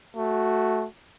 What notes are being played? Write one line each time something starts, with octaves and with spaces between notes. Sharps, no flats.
A3 F#4